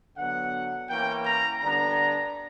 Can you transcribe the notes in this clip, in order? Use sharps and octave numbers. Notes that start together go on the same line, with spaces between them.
D3 F#3 B3 F#5
E3 A#3 C#4 G5
A#5
D3 G3 B3 D4 A#5